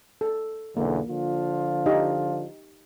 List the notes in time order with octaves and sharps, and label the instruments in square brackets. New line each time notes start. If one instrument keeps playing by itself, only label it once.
[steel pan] A4
[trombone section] B1 E2 D3 [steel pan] A#3
[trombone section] D3 F3 F4
[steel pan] D#4 G4 D#5